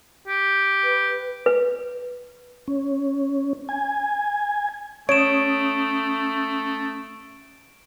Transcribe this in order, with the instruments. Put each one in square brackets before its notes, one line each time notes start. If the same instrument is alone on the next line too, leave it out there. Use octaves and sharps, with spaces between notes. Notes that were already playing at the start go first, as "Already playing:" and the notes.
[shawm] G4
[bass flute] B4
[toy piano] B4
[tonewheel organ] C#4
G#5
[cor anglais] A3 [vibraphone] C#4 D#6 [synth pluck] C#5 [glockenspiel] D7 E7